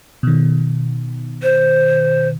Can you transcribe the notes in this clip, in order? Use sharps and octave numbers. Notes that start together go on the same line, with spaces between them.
B2 D#3
C5